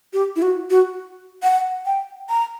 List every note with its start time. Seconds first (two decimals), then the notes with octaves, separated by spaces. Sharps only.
0.13 G4
0.36 E4
0.42 F#4
0.70 F#4
1.43 F#5
1.86 G5
2.29 A#5